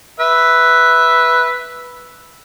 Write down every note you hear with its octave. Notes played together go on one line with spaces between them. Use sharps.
B4 E5